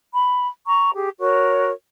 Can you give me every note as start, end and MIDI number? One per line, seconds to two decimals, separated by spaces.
0.13 0.47 83
0.66 0.91 82
0.66 0.91 85
0.94 1.10 67
0.94 1.10 68
1.19 1.71 66
1.19 1.71 70
1.19 1.71 73